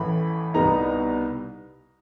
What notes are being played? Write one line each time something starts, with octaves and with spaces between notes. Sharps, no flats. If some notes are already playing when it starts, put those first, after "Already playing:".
Already playing: A1 A2 E3 A3 B5
C2 B2 G3 B3 D#4 A#5